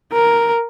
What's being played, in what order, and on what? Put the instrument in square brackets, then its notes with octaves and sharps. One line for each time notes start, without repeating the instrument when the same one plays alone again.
[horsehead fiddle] A#4